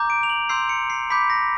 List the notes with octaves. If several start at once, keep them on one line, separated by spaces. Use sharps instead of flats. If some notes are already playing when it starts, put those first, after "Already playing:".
Already playing: A#5 D6 G6
D7
F7
F#7
C6 E6 G6 C7
C#7
C7
B5 D6 G6 B6
A#6